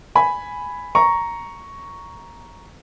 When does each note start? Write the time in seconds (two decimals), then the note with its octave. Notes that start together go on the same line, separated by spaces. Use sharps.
0.15 G#5 B5
0.95 A#5 C#6